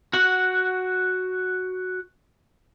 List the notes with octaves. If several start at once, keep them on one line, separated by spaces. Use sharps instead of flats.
F#4 F#5